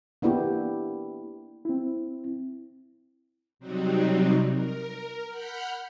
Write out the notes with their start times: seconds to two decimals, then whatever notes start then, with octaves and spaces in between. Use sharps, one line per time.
0.22 A#3 B3 D4 E4 G4
1.65 C4 E4
3.59 C3 F#3 G3 C4 D#4 F#4
4.51 A#4
5.29 F#5 B5 F6 G6